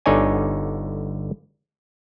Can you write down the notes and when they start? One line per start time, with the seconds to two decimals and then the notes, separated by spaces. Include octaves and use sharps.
0.06 G1 D3 D#4 C#5 D5 G#5